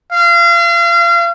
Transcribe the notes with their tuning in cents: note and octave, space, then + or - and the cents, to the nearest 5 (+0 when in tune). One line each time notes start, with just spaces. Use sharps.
F5 -35